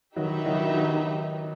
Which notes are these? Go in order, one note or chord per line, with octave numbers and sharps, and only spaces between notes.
D#3 F#3 D#4 G4 B4 E5
D#3 F#3
D#3 F#3